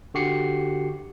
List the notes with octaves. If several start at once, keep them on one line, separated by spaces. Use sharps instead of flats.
D3 F#4 G4 C7 C#7